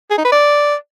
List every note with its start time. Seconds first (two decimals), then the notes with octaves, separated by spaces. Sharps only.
0.11 G#4
0.18 D#4
0.25 B4
0.32 D5